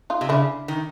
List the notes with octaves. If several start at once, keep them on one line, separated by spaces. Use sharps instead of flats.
D#4 F4
C3
C#3 D4 E4
D#3